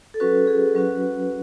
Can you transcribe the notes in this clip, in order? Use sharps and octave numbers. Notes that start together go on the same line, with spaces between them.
A4
F#3 C#4 F#4 B4
G#4
F#3 C#4 F#4 B4